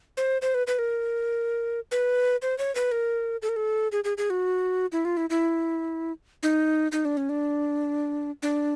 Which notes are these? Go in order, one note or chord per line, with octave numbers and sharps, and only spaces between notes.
C5
C5
B4
B4
A#4
B4
C5
C#5
B4
A#4
A4
A#4
A4
G#4
G#4
G#4
F#4
E4
F4
E4
E4
D#4
D#4
D4
C#4
D4
D4